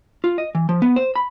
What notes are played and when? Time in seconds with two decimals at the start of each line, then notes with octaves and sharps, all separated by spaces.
0.24 F4
0.38 D#5
0.55 E3
0.69 F3
0.82 B3
0.96 C5
1.16 B5